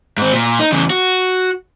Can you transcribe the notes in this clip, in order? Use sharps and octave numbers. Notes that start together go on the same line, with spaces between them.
G#2 C4
A#2
D#4
E2 C#3
F#4